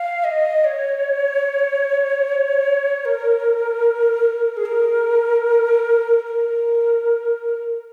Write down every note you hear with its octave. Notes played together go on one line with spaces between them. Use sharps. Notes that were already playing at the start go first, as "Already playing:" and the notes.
Already playing: F5
D#5
C#5
A#4
G#4
A#4
A#4